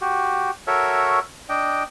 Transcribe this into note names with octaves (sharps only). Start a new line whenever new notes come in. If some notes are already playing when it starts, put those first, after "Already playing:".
F#4 G4
F#4 A4 A#4 C#5 E5
D4 D#5 G5